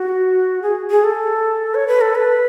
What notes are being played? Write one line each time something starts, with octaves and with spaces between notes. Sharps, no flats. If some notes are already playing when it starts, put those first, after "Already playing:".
Already playing: F#4
G#4
G#4
A4
C#5
B4
A4
B4